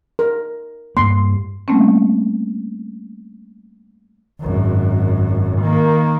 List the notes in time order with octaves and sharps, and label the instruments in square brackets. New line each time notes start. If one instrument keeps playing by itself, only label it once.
[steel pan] A#4
[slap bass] G2 A#3 [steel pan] C6
[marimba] G3 A3 A#3 C4 C#4
[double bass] G#1 F#2
D#3 A#3